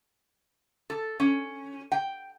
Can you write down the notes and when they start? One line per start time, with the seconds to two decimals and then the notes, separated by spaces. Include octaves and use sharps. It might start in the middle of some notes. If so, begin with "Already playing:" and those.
0.90 A4
1.20 C#4
1.92 G5